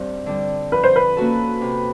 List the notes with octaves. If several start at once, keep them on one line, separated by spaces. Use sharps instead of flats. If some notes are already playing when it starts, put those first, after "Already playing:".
Already playing: G2 C4
D3 G3
F3 B4
C5
B4
A#3 C#4 F#4 A4
C3